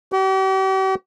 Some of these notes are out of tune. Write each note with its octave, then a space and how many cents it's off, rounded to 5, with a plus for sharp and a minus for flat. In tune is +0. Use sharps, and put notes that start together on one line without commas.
G4 -45